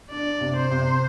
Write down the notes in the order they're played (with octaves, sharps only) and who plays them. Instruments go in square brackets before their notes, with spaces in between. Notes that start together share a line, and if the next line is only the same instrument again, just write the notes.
[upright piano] D4 [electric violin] D5
[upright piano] C3
[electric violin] C5
[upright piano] C3